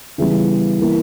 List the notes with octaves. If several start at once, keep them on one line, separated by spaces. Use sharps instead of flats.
C#3 E3 G3 B3 E4
E3 A#3 E4